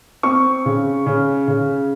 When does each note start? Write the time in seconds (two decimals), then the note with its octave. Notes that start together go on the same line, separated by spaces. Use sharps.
0.23 C4 C#6
0.66 C#3
1.06 C#3
1.48 C#3